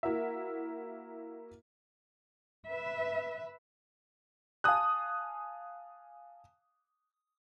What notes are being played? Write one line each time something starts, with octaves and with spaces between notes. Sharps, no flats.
A#3 E4 F#4 A#4 E5
B4 E5
F5 G#5 A5 D#6 F#6